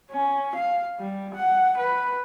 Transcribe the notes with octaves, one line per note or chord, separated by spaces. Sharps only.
C#4
F5
G3
F#5
B4